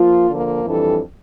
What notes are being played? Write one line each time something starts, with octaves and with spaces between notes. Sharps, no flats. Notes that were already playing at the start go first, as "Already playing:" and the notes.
Already playing: F3 A#3 F4
D3 F3 A#3
F2 E3 G3 D4 A4